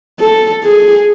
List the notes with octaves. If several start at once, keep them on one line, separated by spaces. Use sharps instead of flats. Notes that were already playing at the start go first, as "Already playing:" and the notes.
A4
G#4